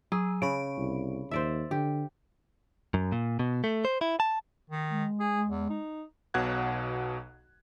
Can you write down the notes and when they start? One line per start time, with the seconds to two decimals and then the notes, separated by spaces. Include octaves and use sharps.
0.12 F#3 G#4
0.42 C#3 B5 C#6 D7
0.77 C2
1.31 D#2 C5 D5 E5
1.71 D3 G4
2.94 F#2
3.12 A#2
3.39 B2
3.64 A3
3.85 C5
4.01 E4
4.20 A5
4.70 D#3
4.90 G#3
5.20 G#4
5.48 E2
5.70 D#4
6.34 B1 B2 F#3 F#5 F#6 G#6